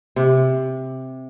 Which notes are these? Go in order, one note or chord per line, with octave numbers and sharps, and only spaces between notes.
C3